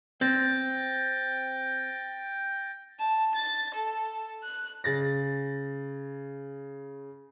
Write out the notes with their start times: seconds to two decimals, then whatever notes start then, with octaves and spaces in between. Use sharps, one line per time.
0.21 C4 G5 G6 A6 A#6
2.99 A5
3.35 A6
3.74 A4
4.43 F#6
4.84 C#3 A6 A#6